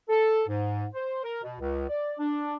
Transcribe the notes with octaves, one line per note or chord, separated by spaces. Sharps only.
A4
G#2
C5
A#4
B2
C#2
D5
D4